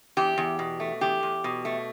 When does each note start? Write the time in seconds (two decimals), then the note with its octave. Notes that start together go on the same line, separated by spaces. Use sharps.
0.17 E2 G4
0.38 E2
0.59 B2
0.80 A3
1.01 E2 G4
1.23 E2
1.44 B2
1.65 A3